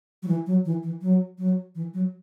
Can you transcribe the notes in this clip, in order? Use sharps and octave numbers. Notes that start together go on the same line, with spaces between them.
F#3
E3
F#3
E3
E3
F#3
F#3
E3
F#3